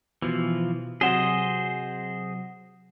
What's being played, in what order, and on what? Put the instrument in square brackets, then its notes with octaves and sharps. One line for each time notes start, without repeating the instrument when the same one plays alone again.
[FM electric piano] B2 [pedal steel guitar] E3 F3
[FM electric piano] C3 F#3 [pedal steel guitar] G#4 C5 D#5 [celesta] F#5 E7 G7